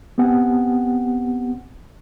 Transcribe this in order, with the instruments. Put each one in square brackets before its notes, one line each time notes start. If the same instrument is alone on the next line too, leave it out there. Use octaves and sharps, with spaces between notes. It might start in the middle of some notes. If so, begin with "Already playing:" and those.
[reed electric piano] B3 C4 G4 F#5 G#5